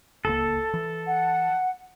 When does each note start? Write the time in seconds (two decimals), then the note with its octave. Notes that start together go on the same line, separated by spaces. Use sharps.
0.25 D1 C#2 A#3 A4
0.74 E3
1.07 F#5